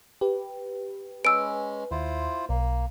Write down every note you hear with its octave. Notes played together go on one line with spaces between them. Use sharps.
G4 B4
G#3 C#4 B4 E6 D7
D#2 E4 F4 C5
B1 A#3